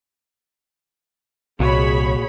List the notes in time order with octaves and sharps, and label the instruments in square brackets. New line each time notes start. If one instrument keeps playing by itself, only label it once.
[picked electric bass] C2 [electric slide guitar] A#2 F#4 [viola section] G#4 C#5 B5